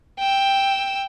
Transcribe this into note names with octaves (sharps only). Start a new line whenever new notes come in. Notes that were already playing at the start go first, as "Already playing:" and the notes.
G5 E6